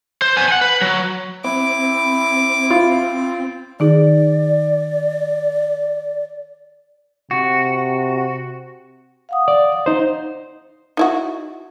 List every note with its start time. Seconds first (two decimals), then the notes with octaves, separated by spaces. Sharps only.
0.22 C5
0.37 B3 G#5
0.48 F#5 G#5
0.61 B4
0.81 F#3
1.44 C4 E4 D6
2.71 F4
3.80 D#3 D#4 G#4 D5
7.31 C3 F#4
9.29 F5 F#5 D#6
9.48 D5
9.86 D#4 C5
10.97 D#4 E4 F#4